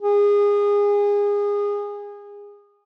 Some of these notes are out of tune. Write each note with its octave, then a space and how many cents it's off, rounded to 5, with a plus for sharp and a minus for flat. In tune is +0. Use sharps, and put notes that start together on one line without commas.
G#4 -25